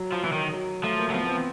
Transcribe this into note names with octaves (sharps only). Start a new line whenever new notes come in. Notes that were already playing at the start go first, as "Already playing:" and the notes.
Already playing: F#3
F3
E3
D#3
F#3
F3 A3
A#3
F#3
F3 B3
B3
C4